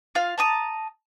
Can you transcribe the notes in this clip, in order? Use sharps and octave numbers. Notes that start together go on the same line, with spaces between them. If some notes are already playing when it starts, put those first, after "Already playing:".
F4 F5
A5 A#5 D#6